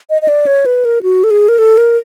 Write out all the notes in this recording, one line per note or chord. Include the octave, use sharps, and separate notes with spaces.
D#5
D#5
D5
C#5
B4
A#4
F#4
A4
G#4
A#4
A4
A#4